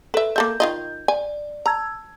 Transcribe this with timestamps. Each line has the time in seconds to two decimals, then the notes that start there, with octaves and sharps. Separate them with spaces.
0.14 A4 B4 E5
0.36 A#3 A4 E5 G6
0.60 D#3 F4 D#5
1.08 D5 G#5
1.66 A5 A#5 E6 G#6